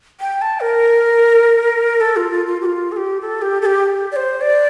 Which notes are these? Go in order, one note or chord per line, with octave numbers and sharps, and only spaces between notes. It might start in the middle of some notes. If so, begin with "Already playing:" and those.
G5
A5
A#4
A4
F4
F4
F4
G4
F4
A4
G4
A4
G4
A4
G4
D5
C5
D5